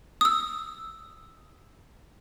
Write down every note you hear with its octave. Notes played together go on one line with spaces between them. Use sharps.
D#6 E6